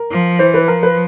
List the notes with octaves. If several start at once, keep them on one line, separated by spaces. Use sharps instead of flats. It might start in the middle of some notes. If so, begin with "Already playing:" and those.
Already playing: A#4
F3
E3 C5
B4
F3 A#4
B4